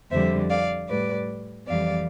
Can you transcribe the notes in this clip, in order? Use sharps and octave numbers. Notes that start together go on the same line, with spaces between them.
F2 D3 G3 C5 E5
D5 F5
A2 G3 B4 D5
F2 E3 G3 D5 F5